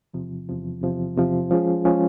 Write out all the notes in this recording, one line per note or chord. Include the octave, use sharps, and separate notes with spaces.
E2 C3 F3
E2 C3 F3
E2 C3 F3
E2 C3 F3
F3 G#3 C#4 F4 G#4
F3 G#3 C#4 F4 G#4